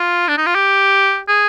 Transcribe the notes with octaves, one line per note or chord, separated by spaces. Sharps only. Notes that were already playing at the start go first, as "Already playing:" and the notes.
Already playing: F4
D4
D#4
F4
G4
G#4